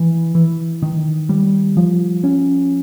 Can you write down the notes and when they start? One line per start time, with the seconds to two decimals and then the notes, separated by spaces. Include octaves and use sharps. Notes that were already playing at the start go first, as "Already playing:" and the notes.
Already playing: E3
0.35 E3
0.82 D#3
1.29 G3
1.77 F3
2.24 C#4